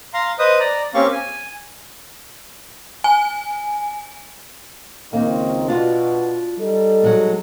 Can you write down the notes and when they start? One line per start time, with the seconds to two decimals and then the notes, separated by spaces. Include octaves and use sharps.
0.14 F5 A#5 C6
0.39 B4 C5 D#5 D#6
0.60 D5 A#5
0.94 A#3 C4 C#4 G4 F5 C#6
1.12 G#5
3.04 G#5
5.13 C#2 D#3 A#3 C4 D#4
5.68 B2 D4 F4 F#4
6.58 G3 D#4 A4
7.02 F#3 G#3 B3